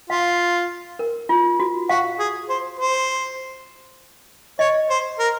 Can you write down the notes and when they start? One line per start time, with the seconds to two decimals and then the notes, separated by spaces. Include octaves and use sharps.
0.10 F4 F5
0.99 A#4
1.29 F4
1.60 F#4
1.89 F#4 F5
2.19 G#4
2.49 C5
2.79 C5
4.59 C#5 D#5
4.90 C5
5.19 A#4